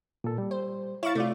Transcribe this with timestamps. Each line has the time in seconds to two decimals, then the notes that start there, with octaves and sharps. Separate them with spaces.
0.24 A#2 A4
0.38 G3
0.51 C5
1.03 E4 C#5 F5 C#6 A6
1.15 C3 A3 F4 D5